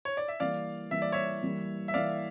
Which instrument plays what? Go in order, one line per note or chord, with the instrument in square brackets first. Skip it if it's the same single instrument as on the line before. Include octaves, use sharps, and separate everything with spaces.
[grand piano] C#5
D5
E5
[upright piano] E3 G3 A#3 [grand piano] D5 F5
[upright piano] E3 G3 A#3 [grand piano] E5
[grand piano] D5
C#5 E5
[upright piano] E3 G3 A#3
[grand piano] E5
[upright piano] E3 G3 A#3 [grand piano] D5 F5